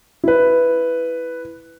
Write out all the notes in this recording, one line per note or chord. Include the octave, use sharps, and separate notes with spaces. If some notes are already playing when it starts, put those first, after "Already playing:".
E4 B4